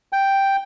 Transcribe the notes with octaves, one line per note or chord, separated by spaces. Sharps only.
G5